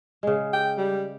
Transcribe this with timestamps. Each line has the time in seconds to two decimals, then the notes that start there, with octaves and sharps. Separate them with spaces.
0.23 C#3 G#3
0.53 G5
0.78 G3